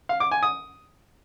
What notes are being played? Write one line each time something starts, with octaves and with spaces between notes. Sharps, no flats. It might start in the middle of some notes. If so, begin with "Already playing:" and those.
F5
D6
G#5
D#6